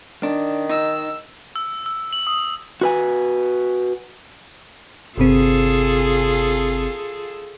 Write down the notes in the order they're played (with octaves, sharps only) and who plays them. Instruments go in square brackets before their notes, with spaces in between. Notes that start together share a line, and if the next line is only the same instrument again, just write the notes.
[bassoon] D#3 [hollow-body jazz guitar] D4
[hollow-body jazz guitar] D#4 [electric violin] E6
[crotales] E6
E6
F#7
D#6
[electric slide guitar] F#4 B4 G#5
[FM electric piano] G1 C3 C4 [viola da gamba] F4 G#4 A4